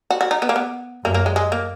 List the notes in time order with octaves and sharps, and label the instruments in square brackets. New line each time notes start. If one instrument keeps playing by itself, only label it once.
[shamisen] F#4
F#4
D#4
B3
A#3
B3
[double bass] F#2 [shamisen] A#3
[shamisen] A#3
G#3
G#3
A#3